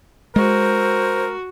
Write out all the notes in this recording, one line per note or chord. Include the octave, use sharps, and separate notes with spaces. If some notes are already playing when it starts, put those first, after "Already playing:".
G#3 F#4 A#4 C5